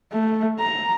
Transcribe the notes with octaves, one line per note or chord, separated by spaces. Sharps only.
A3
A#5